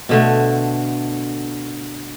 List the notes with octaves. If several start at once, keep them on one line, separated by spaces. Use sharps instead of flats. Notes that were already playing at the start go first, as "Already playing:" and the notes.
B2 D3 A3